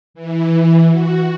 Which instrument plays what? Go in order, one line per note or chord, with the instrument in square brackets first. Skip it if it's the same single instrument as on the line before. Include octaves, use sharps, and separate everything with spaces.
[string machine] E3
F#4